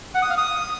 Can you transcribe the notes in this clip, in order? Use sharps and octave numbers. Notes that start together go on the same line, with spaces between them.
F#5
D#6
F5
D#6